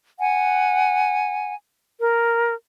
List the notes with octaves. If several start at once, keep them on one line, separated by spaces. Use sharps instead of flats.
F#5 G#5
A#4